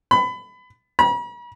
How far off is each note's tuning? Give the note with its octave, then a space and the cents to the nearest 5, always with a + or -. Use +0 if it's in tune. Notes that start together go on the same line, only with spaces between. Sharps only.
B5 +25
B5 -45